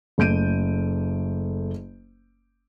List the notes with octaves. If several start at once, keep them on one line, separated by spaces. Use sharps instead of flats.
F#1 A3 G6 D7 D#7